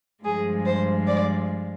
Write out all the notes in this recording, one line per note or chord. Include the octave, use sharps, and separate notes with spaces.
G2 F3 G#3 G#4
C5
D5